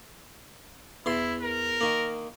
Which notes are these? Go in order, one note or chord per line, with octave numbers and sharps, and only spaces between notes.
E2 E4 C6
A#4
D#3 A#3